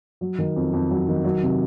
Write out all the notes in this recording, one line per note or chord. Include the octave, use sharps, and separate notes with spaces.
F#3
D#3
F2
F2
F#3
D#3
F#3
C3